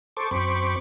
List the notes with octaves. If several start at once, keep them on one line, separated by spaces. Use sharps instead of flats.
A4 C5 C#6 D6
F#2 C4 C5 B5 C#6 D6